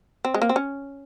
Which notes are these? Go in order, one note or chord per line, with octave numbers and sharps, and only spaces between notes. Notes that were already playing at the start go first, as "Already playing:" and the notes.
C4
G#3
A#3
C4
C#4